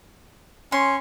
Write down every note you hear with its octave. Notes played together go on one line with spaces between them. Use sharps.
C#4 C6